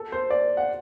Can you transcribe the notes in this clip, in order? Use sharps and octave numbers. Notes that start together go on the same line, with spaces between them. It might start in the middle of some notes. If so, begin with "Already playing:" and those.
Already playing: A4
C5
D5
F#5